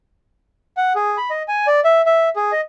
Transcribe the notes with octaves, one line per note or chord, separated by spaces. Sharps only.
F#5
G#4
B5
D#5
G#5
D5
E5
E5
G#4
D#5